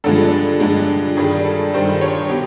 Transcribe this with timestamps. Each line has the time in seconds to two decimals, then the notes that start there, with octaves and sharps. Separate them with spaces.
0.04 G2 D3 F3 G#3 A4
0.60 G2 D3 F3 G#3
1.17 G2 D#3 G3 G#4
1.45 A4
1.73 G2 D#3 G3 C5
2.01 C#5
2.29 B2 G4